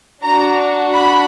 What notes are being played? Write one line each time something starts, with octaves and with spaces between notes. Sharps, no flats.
D4 F#4 A#5
B5